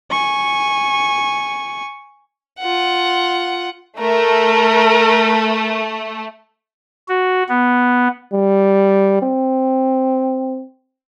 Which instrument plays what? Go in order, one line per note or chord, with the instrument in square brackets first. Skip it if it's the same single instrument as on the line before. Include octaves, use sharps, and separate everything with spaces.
[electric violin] G#5 C#6
[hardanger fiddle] F4 F#5
[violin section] A3 [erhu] A#4
[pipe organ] F#4
B3
[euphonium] G3
C4